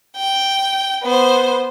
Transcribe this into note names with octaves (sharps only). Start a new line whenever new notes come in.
G5
B3 C5